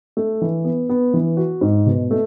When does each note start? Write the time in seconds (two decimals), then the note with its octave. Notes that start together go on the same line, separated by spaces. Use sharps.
0.17 A3
0.42 E3
0.65 B3
0.89 B3
1.14 E3
1.37 F#4
1.61 G#2
1.86 B2
2.11 A3